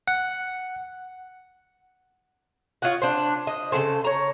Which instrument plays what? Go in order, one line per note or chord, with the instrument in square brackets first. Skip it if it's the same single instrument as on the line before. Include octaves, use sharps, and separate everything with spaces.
[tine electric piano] F#5
[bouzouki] F4 C#5 D#5 F#5
D4 C5
D#5
C#3 F#3 A4 C5
C#5 A#5